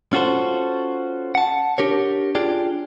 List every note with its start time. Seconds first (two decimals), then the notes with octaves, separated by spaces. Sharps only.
0.13 C#4 F4 F#4 A4 C5
1.35 F#5 A5
1.78 D4 G4 A#4 C#5
2.35 D4 F4 G4 G#4 D5